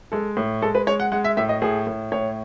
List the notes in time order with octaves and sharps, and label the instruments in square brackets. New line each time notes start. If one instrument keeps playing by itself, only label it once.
[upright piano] G#3 A4
A2
G#3 A4
B4
G#3 C#5
F#5
G#3 F#5
E5
A2 E5
D#5
A2 G#4
A2
A2 C#5